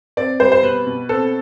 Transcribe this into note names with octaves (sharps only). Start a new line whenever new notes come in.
C4 D5
G3 C5
C5
B2 B4
B2
C4 A4